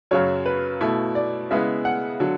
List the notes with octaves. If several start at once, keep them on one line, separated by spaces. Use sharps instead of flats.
F#2 C#3 F#3 C#5
B4
B2 A3 E4
D5
C#3 G#3 B3 E4 E5
F#5
D3 F#3